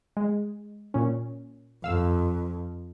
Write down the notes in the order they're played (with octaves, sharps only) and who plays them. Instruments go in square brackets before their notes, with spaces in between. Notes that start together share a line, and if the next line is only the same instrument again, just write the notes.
[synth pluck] G#3
A#2 C#4
[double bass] F2 [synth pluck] F5 E6